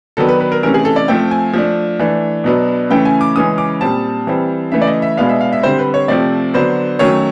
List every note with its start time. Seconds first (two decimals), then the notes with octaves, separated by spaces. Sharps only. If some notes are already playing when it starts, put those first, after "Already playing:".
0.17 D#3 F#3 B3 D4 A4
0.29 B4
0.40 B4
0.52 A#4
0.63 C3 E3 A3 C#4 A#4
0.74 G#4
0.85 A4
0.96 D5
1.08 F3 A3 C4 G5
1.31 G#5
1.53 F3 A3 D4
1.99 E3 A3 D4
2.44 B2 F#3 B3 D4
2.90 C#3 E3 A3 C#4 G5
3.05 G#5
3.21 D6
3.36 C#3 E3 G#3 C#4 D#6
3.58 D6
3.81 A#2 G3 C4 A5
4.27 E3 G3 C4
4.72 C#3 E3 A3 E5
4.82 D5
4.87 D#5
5.02 E5
5.17 B2 G#3 B3 D4 F5
5.29 E5
5.41 F5
5.53 E5
5.63 D3 G3 C4 C5
5.79 B4
5.94 C#5
6.08 C3 F3 A3 C4 D5
6.54 D3 F#3 B3 D4 C5
6.99 D#3 F#3 A3 C#4 C#5